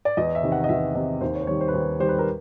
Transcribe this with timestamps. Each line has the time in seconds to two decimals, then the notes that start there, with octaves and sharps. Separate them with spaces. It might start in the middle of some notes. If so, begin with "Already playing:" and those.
0.05 D5
0.17 E2 D#5
0.35 E5
0.43 C3 D#3
0.52 F#5
0.64 D#5
0.69 E2 E5
0.95 C3 D#3 D#5
1.21 D#2 C5
1.35 C#5
1.42 C5
1.47 D#3 G3 C#5
1.61 C5
1.68 B4
1.74 D#2 C5
2.00 D#3 G3 C5
2.09 B4
2.19 A#4